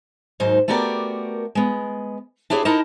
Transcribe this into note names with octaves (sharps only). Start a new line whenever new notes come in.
D#2 G#2 F#3 D#4 C5
A3 B3 F#4 G4 A#4 D5
G#3 B3
D4 E4 G4 G#4 C#5
D#4 E4 A#4 D#5 A5